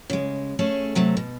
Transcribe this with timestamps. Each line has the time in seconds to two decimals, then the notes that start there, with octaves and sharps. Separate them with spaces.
0.10 C#3 G#3
0.59 A3 C#4 G#4 A4
0.95 C3 F#3 A3
1.17 B2